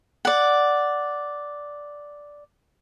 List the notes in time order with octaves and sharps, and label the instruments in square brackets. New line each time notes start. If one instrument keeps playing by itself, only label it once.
[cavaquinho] D5 F#5